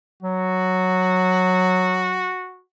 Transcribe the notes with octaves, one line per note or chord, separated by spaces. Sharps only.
F#3 F#4